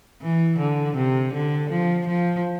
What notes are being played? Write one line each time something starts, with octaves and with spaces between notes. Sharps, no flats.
E3
D3
C3
D3
F3
F3